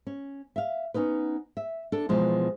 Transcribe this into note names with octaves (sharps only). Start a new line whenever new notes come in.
C#4
E5 F5
B3 C#4 D#4 B4
E5
D4 A4
B2 E3 F3 G#3